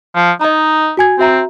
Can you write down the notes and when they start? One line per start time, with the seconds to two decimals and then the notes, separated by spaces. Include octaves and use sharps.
0.16 F3
0.41 D#4 D#5 A#5
0.97 F#4 G#5 G#6
1.19 C4 F#4 E5 A#5